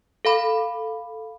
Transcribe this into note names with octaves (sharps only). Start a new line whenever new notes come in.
A4 F5 B5